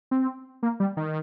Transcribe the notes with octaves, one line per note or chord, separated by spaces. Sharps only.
C4
A#3
G3
D#3